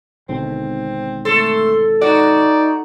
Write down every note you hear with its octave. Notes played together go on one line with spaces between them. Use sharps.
G#1 B2 D3 C4
A3 A4 C6
D#4 F#4 D5